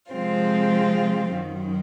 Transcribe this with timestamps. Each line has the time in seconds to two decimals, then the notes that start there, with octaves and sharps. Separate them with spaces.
0.12 C3 F3 G#3 C4 F4
1.32 F#2 D#3 F#3